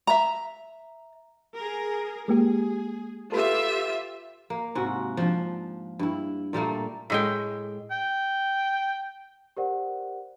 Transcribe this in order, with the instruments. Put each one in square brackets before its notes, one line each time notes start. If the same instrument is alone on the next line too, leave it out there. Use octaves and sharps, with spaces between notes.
[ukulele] E5 A#5
[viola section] G#4 A#4
[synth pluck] G#3 A#3 G4 [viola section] G#4
[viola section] F4 G4 E5 [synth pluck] A4 B4 B5
[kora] A#3
G#2 C3 F#4
F3 D4
G2 E4
A#2 G3 A3 A#3
[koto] A2 G#3 G5
[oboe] G5
[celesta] G4 A#4 C5 D5 F#5